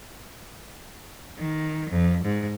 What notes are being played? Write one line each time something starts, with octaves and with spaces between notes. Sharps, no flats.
D#3
F2
G#2